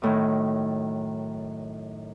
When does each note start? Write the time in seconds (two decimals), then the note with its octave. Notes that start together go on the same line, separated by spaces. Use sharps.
0.02 F#2 A2 D#3